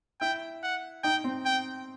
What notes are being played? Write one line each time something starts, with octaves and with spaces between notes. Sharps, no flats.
E4 G5
F#5
D#4 G5
C4
G5